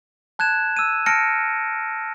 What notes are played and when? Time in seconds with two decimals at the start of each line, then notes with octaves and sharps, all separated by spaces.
0.39 A5 F#6 G#6 E7
0.77 E6 D#7
1.06 A5 F6 A#6 C#7 D7